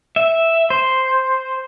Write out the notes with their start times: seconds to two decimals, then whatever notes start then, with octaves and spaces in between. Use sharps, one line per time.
0.16 E5
0.70 C5